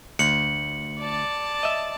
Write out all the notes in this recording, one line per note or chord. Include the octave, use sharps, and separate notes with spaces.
D2 C#7 F#7
D5 A5
D#5 E5